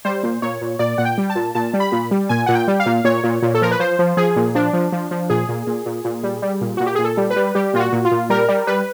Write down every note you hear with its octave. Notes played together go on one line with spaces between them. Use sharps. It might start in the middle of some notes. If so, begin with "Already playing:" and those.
G3 C5
A#2
A#2 C#5
A#2
A#2 D5
A#2 F#5
G5
G3
A5
A#2
A#2 A5
G3
B5
A#2
G3
A#2 G#5
A#2 F#5
G5
G3
F5
A#2
A#2 C#5
A#2
A#2
A4
F3 A#4
B4
F3 C5
F3
F3 G#4
A#2
F3 D4
F3
F3
F3
A#2 G#4
A#2
A#2
A#2
A#2
G3
G3
A#2
A#2 F#4
G4
A#2 G#4
A4
G3
B4
G3
G3 G4
A#2 F4
F#4
A#2
F4
A#2
G3 A#4
G3
G3 B4